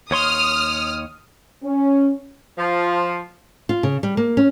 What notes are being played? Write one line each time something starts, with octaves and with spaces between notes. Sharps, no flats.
D#2 C#5 C6 D#6 F6
C#4
F3
F4
C#3
G3
A#3
C#4